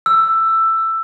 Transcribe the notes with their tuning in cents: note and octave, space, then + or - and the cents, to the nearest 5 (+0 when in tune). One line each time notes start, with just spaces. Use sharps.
E6 +10